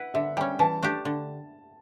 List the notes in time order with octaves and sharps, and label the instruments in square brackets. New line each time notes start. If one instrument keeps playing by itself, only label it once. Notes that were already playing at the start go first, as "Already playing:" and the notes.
Already playing: [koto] E4 B4 [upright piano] F#5
[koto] D3 [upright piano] E5
[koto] G3 C#4 [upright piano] G5
[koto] E3 [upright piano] A5
[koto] A3 D4 G4
D3